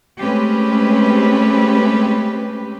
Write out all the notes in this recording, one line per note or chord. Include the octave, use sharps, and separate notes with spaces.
G#3 A3 C4 C#4 G4 B4